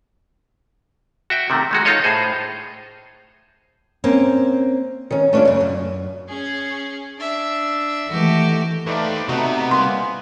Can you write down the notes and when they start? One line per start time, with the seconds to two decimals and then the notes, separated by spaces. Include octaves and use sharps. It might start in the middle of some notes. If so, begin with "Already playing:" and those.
1.30 F#4 E5 G5
1.50 C3 D#3 A3
1.71 D#3 G#3 F#4
1.85 D#4 F4 A4 C#5 D#5
2.04 A2 G#4 C5
4.04 A#3 C4 C#4
5.11 D#3 C#4
5.33 A3 C#4 D4 F4 D5
5.45 F#2 C#3
5.61 F#2
6.28 C#4 G#4
7.18 D4 E5
8.10 D#3 E3 A3 F#4 G4
8.87 D#2 D#3 A3 B4 C5 D5
9.29 C3 A3 B3 D#4 F#4
9.71 C2 A#3 G#5 C6